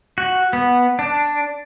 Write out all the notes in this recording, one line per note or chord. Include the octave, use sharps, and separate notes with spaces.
F#4
B3
D4